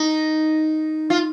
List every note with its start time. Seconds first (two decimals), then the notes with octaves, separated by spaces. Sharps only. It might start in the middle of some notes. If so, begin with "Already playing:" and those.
Already playing: D#4
1.10 F4